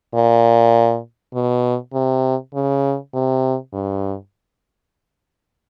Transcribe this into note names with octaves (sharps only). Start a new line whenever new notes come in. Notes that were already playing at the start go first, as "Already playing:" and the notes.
A#2
B2
C3
C#3
C3
G2